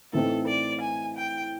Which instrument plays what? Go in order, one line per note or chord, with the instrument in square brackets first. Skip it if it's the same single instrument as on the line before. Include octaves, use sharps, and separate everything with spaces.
[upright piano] A2 E3 A3 C4 D#4 [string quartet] A4
[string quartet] D5
G#5
G5